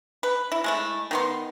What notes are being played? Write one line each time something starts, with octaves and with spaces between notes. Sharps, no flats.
B4
E4
G#3 A3 E4
D#3 B3 C6